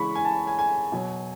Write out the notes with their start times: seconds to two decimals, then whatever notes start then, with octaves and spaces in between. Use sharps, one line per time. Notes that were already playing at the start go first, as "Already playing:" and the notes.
Already playing: C#3 E3 G#3 B5 C#6
0.15 G#5
0.25 A5
0.47 G#5
0.59 G#5
0.92 B2 F#3